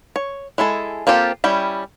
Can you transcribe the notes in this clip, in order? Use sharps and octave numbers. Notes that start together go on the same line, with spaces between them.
C#5
G#3 E4 G#4 A4
A#3 C4 F4 G4 A4
G3 C#4 E4 G5